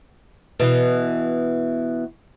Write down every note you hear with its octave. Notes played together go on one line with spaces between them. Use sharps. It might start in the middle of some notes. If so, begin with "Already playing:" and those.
B2 E3